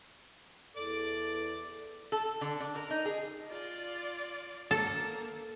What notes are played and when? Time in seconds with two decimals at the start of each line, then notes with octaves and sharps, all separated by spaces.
0.76 E2 A4 D5 D6
2.12 A4
2.41 D3
2.60 D4
2.76 A#4
2.90 D#4
3.05 G#4
3.49 F4 D5
4.71 A#3 A4